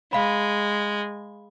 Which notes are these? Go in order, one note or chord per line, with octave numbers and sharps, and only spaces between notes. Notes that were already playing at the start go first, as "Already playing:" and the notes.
G#3 F5 B5